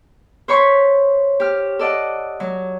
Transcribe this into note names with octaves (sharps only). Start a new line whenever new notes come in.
C5 C#5 B5 C#6
G4 F6
A4 D5 D#5 F#5
F#3